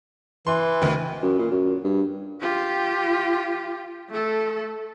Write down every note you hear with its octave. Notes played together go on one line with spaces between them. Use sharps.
E3 C6
D2 D#3
F#2
A#2
F#2
G2
F4 G4
A3 A4